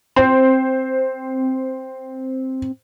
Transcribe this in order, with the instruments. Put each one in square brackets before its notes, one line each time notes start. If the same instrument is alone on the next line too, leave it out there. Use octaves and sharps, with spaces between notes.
[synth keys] C4 [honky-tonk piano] C5